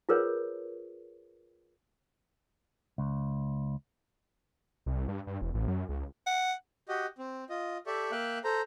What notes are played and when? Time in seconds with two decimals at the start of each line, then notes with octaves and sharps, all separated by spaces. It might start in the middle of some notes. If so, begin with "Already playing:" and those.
0.09 F4 G#4 A#4 B4 C#5
2.98 C#2
4.86 C2
5.08 G2
5.27 G2
5.41 E1
5.54 A1
5.68 F#2
5.89 C#2
6.26 F#5
6.88 F#4 G4 D#5
7.18 C4
7.50 F4 D#5
7.86 G4 A4 D5 E5 C#6
8.11 A#3 E5 F5 G5 F#6
8.44 A4 C5 A#5